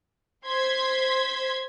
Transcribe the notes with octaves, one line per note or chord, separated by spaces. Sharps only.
C5 C6 G#6 B6